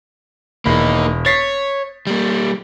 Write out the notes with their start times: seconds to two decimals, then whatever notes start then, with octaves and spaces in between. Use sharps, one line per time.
0.66 E1 A#3 D#4 B5
1.26 C#5 A6 B6 C7
2.07 G3 A#3